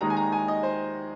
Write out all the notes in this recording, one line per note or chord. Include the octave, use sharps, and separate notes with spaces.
D#2 D#3 G#3 D#4 A#5
G#5
A#5
G#5
D#5
C5